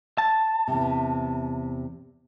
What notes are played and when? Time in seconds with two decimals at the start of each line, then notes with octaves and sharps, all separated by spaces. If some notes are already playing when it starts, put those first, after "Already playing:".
0.18 A5
0.68 E2 C3